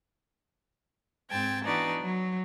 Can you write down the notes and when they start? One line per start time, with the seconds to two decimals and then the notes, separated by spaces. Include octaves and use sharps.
1.30 G#2 C4 G5 A5 G#6
1.65 E3 B3 D4 D#4 F#4 D5
2.01 F#3